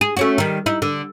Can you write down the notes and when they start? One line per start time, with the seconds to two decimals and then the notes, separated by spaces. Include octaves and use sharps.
0.01 G#4
0.17 A3 C#4 F#4
0.38 D#3 G3
0.66 D#4 E4
0.82 D3